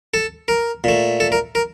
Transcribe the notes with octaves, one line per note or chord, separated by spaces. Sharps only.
A4
A#4
A#2 A3
A4
A#4
A#4